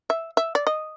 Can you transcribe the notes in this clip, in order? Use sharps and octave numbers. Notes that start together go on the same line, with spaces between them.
E5
E5
D5
D#5